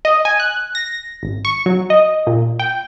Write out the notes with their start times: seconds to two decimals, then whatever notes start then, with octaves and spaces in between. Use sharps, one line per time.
0.05 D#5
0.25 G#5
0.40 F#6
0.75 A#6
1.23 G#1
1.45 C#6
1.66 F#3
1.90 D#5
2.27 A#2
2.59 G5